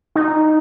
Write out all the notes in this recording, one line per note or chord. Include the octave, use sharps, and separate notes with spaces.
D#4